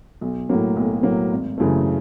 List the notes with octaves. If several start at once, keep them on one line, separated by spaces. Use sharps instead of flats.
B1
A2 F#3 A#3
B1
A2 F#3 A#3
G#1
F#2 C#3 E3 A3